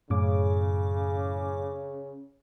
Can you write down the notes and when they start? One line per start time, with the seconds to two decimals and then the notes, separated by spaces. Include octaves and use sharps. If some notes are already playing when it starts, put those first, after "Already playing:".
0.10 F#2 A2 C#3 D6